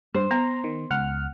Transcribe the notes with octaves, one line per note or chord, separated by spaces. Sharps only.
G2 C5
B3 A#5
D#3
C#2 F#5 F6